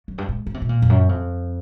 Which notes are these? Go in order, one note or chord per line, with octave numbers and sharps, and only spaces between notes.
F#2
G2
G#2
C#3
C3
B2
A#2
F2
F#2
F2